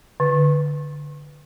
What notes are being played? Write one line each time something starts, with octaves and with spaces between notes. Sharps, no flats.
D3